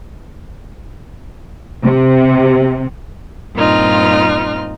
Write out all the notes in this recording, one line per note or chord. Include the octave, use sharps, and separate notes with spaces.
C3
G2 A#2 C4 D#4 F4 F6